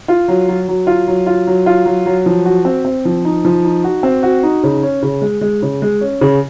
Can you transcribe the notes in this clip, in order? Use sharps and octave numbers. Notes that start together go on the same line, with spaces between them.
F4
F#3
F#3
F#3
F4
F#3
F4
F#3
F4
F#3
F#3
F3
F#4
C4
C4
F3
D#4
F3
D#4
F#4
C4
F#4
D#4
C#3
C#4
C#3
G#3
G#3
C#3
G#3
C#4
C#3